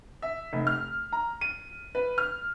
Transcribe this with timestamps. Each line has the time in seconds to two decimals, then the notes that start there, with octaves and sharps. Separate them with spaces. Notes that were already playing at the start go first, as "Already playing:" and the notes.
0.22 E5
0.53 F1
0.67 F6
1.13 A#5
1.41 D#7
1.95 B4
2.18 F6